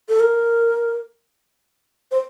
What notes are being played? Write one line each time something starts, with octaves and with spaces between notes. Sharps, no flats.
A4
A#4
C5